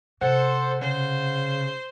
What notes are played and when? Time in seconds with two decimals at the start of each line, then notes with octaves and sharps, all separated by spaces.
0.21 C3 A4 C5 F#5
0.81 C#3 C5